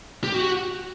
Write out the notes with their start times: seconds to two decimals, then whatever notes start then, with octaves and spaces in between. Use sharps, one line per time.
0.24 G4
0.34 F#4